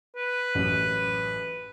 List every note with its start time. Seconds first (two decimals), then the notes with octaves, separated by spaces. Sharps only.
0.16 B4
0.55 A1 F#2